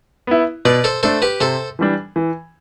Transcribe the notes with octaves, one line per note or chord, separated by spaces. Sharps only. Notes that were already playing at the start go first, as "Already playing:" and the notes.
B3 E4
B2 B4 D5
A4 C5
A3 D4 A4 C5
G4 B4
C3 A4 C5
E3 G3 D4
E3